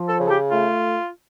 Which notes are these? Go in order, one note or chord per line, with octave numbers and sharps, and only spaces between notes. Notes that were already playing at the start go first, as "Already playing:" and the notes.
Already playing: F3
A4
C#3
A4
G4
A3 F4